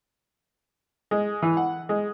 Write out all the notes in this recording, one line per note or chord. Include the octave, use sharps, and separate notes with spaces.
G#3
E3
F#5
G#3